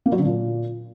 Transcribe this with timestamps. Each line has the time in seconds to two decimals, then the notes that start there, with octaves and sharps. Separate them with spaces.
0.06 A#3
0.12 F#3
0.19 D3
0.25 A#2